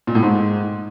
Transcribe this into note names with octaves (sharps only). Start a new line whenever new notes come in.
A#2
A2
G#2